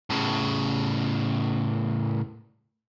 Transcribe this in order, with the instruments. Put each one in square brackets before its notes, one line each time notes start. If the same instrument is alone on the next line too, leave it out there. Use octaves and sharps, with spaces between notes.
[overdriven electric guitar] A2 C#3